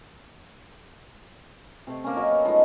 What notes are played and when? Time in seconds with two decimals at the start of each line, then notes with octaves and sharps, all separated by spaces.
1.87 C3 A3 C4
2.04 A#3 C#4
2.16 F#3 A#4 C#5 D#5
2.30 B3
2.45 F3 G#3 A3 D#4